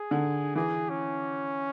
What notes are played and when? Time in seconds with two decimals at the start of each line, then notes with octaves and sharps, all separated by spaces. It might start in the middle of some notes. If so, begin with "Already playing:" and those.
Already playing: G#4
0.11 D3
0.55 E3 G#4
0.89 C#4